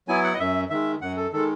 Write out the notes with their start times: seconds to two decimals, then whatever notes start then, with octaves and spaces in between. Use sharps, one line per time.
0.08 F#3 B3 E4 G#5
0.24 F#5
0.34 D#5
0.39 F#2 E5
0.70 D#3 G#3 E5
1.02 F#2 F#5
1.17 A4
1.33 D#3 G#3 A4